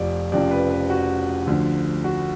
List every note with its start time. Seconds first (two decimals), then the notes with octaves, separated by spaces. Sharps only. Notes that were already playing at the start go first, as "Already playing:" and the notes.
Already playing: F1 F2 F3 D5
0.32 F1 F2 C#3 F3 D5
0.51 B4
0.70 B4
0.90 F#4
1.47 D2 D3 F3
2.04 F#4